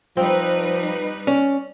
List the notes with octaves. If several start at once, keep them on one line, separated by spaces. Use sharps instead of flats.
F3 G3 C4 D#4 B4
C#4 D5